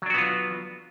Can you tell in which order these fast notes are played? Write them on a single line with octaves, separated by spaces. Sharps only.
F#3 D4 F#4 B3 F4